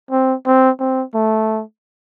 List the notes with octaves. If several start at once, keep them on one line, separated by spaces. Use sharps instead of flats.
C4
C4
C4
A3